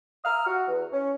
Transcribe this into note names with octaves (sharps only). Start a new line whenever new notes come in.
E5 A#5 D#6 F6
F#4
E2
C#4